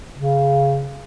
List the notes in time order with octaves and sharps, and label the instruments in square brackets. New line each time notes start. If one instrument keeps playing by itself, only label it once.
[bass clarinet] C#3